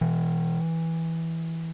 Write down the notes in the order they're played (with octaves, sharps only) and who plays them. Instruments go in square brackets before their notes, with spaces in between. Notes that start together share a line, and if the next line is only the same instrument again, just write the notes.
[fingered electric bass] B2 E3